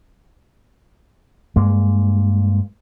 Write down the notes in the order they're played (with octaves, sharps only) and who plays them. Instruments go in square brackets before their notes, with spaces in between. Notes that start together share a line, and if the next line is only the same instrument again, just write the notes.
[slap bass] G2 G#3 A#3